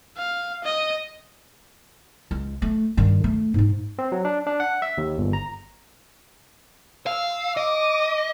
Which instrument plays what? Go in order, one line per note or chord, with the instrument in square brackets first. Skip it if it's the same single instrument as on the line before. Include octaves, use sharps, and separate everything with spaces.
[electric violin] F5
D#5
[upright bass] C#2
A3
G2 D#3
A3
G#2 D#4
[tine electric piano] C4
F#3
D4
D4
F#5
E5
D#2
G1
A#5
[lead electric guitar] F5 [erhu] E6
[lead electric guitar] D#5 [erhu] D6